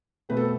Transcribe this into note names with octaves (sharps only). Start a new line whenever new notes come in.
B2 A3 C4 B4
A4